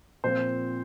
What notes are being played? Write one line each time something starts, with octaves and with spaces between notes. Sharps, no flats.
A#2 F3 C4 C5